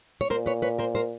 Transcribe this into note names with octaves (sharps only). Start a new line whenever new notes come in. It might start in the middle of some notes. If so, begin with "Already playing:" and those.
C#5
A#2 A#4 C5
B4 C#5
B4 C#5
A#4 C5
A#4 C5